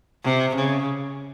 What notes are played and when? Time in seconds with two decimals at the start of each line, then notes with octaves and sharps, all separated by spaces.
0.24 C3
0.56 C#3